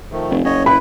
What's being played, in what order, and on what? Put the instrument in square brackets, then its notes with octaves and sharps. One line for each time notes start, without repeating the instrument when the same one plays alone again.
[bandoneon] D#3 F3 A3
[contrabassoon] F1
[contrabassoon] F#1 [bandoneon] C#5 D#5
[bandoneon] E4 B4 [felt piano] B5